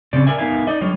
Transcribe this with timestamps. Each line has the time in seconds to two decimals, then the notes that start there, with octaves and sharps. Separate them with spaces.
0.13 C#3 C4 C#4 D5
0.26 A#4 D5 E5 G#5
0.38 B3 D#4 A#4 E5 F5 G#5
0.67 D#4 D5 D#5
0.81 D3 F#3 G3 F4 C#5 D#5